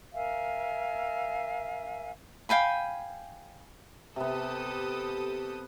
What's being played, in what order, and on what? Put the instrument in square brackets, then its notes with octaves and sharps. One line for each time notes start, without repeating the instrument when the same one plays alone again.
[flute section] A#4 E5 F5 G#5
[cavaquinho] F5 G5 G#5 B5
[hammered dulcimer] C3 B3 [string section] G4 A4 D#6